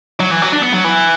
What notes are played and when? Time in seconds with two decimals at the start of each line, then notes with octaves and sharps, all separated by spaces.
0.20 F#3
0.31 E3
0.42 F#3
0.52 D4
0.63 B3
0.73 F#3
0.85 E3